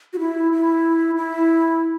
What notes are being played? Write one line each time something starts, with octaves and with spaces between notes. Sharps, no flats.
F#4
E4
E4
E4